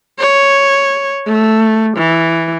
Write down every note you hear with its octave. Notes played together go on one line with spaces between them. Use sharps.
C#5
A3
E3